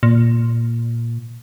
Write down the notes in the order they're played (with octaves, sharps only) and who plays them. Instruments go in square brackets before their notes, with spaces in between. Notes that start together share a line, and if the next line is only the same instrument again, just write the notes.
[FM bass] A#2